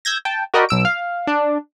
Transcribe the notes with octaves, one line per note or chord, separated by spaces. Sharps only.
E6 G6 G#6 A#6
G5 A5
F#4 A#4 D5 D#5 G5 B5
B1 E6 D7
F5
D4